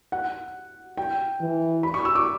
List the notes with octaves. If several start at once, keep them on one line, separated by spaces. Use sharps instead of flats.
F#5
G5
E3
B5
C#6
E6
D6